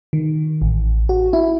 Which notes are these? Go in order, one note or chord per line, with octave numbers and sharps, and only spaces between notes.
D#3
A1
F#4
E4